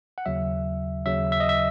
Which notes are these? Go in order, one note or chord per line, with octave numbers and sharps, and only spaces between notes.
F#5
D#2 C#3 F#3 E5
D#2 C#3 F#3 E5
E5
D#5
E5